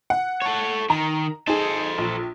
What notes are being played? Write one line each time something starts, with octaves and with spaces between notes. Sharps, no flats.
F#5
A4 C#5
D#3 A#5
D#4 G#4 A4 C5
A#1